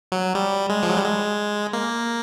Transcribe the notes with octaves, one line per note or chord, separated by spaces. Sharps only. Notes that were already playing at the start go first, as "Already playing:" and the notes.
F#3
G3
G#3
F3
F#3
G3
G#3
A#3